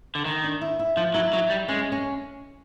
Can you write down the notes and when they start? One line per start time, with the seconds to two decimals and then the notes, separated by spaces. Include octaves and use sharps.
0.15 D3
0.25 D#3 D#4
0.44 D4
0.61 E4
0.79 E4
0.97 F3 F4
1.14 F#3 E4
1.33 F#3 D#4
1.50 G3
1.68 G#3 C#4
1.92 C#4